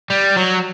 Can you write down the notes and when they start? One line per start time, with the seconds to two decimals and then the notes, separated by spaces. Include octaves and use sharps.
0.10 G3
0.37 F#3